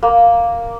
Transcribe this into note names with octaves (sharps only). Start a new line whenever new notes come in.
A#3